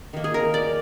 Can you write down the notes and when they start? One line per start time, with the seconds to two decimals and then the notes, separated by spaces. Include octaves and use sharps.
0.13 D#3 A#3
0.24 G#4
0.34 A#4
0.54 D5